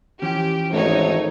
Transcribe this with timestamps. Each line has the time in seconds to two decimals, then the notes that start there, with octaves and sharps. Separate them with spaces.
0.22 E3 F3 C#4 G4
0.73 G#1 A3 D#4 C#5